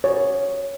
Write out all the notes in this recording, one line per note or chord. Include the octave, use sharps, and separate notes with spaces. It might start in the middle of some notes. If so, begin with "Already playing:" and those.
C#5